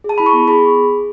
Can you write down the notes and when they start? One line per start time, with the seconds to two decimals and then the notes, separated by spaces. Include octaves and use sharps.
0.04 G#4
0.09 A5
0.18 E4 B5
0.26 C#6
0.33 B3
0.48 G#4 B5